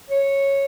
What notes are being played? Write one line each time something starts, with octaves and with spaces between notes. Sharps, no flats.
C#5